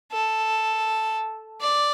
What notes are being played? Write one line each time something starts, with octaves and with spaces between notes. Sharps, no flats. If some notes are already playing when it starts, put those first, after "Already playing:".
A4
D5